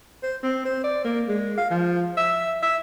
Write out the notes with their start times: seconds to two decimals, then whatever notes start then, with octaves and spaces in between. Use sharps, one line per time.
0.23 C5
0.43 C4
0.65 C5
0.84 D5
1.04 A#3
1.28 G#3
1.58 F5
1.71 F3
2.17 E5
2.62 E5